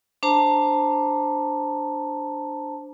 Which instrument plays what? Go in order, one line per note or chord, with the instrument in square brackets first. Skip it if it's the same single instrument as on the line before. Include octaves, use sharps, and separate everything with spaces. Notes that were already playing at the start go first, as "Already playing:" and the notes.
[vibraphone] D4 C5 A5 A#5